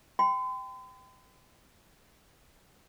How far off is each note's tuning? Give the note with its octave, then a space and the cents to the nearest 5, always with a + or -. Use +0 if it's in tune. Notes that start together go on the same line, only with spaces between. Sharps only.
G5 +0 C6 -45